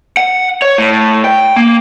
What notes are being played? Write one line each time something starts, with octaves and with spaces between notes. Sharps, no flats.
F#5
C#5
A2
G5
A#3